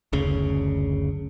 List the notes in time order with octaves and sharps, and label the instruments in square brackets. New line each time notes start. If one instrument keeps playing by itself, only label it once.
[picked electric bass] F#1 D2 C#3